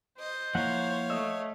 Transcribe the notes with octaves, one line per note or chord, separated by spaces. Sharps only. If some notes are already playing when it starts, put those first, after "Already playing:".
C5 D#5
F3 A#3 E4 C#5 F5 F#5
A3 D#5 E6